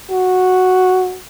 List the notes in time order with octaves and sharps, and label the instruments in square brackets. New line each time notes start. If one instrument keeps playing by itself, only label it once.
[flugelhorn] F#4